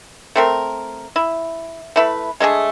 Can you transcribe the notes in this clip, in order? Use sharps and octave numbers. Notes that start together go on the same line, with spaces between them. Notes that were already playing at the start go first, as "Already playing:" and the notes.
A3 C4 A#4
E4
A3 E4 B4
G#3 A3 D4 G#4